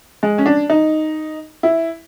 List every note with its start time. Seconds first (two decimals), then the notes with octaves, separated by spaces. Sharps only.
0.23 G#3
0.38 C#4
0.46 D4
0.70 D#4
1.63 E4